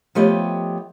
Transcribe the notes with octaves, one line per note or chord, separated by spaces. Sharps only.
F3 A3 B3 G4 C#5 D#5